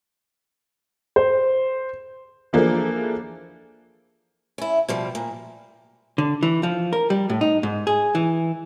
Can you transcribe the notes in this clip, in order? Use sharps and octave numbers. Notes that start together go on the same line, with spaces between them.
C5
E3 F3 A#3 D4 G#4 A4
C#4 E4
B2 F3 G3
A#2
D3
E3
F3
A#4
G3
A2
D#4
G#2
G#4
E3